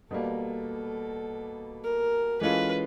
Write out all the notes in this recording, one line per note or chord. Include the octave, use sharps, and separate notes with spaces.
B2 G3 A#3 A4
A#4
E3 G#3 C#4 F4 A4 B4